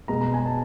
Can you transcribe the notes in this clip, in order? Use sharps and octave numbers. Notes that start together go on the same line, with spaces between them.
B2 G#3 B3 A#5
A#5
G#5
A5